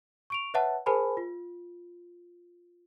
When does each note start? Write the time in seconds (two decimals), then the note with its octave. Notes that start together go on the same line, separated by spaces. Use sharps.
0.30 C#6 D7 F7
0.54 B4 C#5 E5 F#5 A5
0.86 G#4 A#4 C5 G#5 A5 B5
1.17 F4